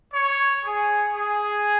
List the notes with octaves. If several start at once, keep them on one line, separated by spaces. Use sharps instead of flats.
C#5
G#4
G#4